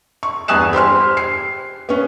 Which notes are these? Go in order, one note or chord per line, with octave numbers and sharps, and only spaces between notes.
C#6
E2 G2 G#5 D#6 F#6 E7
G4 C5 C6 F6
C7
B3 C#4